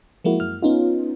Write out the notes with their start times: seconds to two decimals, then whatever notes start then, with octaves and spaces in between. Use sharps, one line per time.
0.24 F3 G#3 A#3 E4 F#4
0.40 F#2 F6
0.62 B3 C#4 D#4 F4